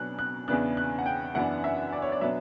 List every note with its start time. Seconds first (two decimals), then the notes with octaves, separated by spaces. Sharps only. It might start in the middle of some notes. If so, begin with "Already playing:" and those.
Already playing: B2 F#3 B3 D4 F#6
0.19 F#6
0.48 E2 C#3 E3 B3 D4 F#6
0.77 F#6
0.99 F#5
1.06 G5
1.35 F#2 E3 B3 D4 F#5
1.64 E5
1.92 D5
2.02 C#5
2.12 D5
2.21 B2 F#3 B3 D4 E5